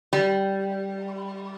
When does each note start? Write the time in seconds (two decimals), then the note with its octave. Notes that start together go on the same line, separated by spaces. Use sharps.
0.13 G3